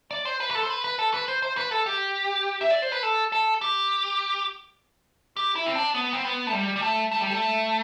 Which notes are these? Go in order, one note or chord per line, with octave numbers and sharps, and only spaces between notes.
D5
C5
B4
B4
A4
C5
B4
B4
A4
B4
C5
C5
B4
A4
G4
E5
D5
C5
B4
A4
A4
G4
G4
E4
C4
D4
B3
C4
B3
A3
G3
G3
A3
A3
G3
A3